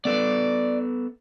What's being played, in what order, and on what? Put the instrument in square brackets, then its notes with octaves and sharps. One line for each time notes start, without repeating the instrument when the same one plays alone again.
[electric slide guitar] B3 A4 B4 [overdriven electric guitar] D5